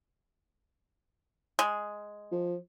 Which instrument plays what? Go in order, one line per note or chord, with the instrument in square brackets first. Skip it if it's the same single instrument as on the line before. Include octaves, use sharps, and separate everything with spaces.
[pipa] G#3
[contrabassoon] F3